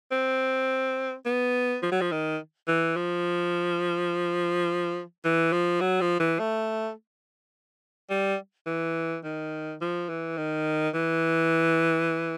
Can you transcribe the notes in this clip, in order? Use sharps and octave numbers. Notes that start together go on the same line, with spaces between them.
C4
B3
F3
F#3
F3
D#3
E3
F3
E3
F3
F#3
F3
E3
A3
G3
E3
D#3
F3
E3
D#3
E3